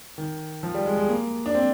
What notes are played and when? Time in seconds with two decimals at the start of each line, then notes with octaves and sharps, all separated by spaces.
0.18 D#3
0.63 F3
0.75 G3
0.86 G#3
0.97 G#3
1.09 A#3
1.46 D4
1.55 C4